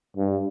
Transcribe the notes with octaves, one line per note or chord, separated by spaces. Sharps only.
G2